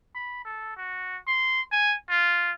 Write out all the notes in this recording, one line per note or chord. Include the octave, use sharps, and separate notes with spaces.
B5
A4
F#4
C6
G#5
F4